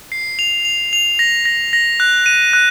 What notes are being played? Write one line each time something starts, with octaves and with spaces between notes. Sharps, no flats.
C7
F7
F7
F7
A#6
A#6
A#6
F#6
D#7
F#6